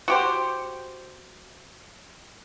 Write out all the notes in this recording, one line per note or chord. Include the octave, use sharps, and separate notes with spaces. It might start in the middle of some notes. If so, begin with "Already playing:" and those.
F#4 G4 C5